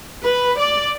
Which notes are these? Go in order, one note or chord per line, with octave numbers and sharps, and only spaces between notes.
B4
D5